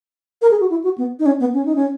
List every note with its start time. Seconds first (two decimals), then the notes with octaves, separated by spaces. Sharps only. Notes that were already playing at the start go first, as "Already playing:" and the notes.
0.42 A#4
0.51 G#4
0.61 F#4
0.70 E4
0.84 F#4
0.98 B3
1.19 D#4
1.26 C#4
1.40 B3
1.54 C#4
1.65 D#4
1.75 C#4